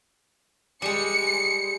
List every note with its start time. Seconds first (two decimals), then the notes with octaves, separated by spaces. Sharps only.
0.82 G3 G#3 C#7